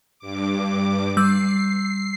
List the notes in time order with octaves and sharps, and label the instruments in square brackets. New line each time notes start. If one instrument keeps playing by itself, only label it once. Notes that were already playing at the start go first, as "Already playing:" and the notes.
[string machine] G2 D6
[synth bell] G3 E6 [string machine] C7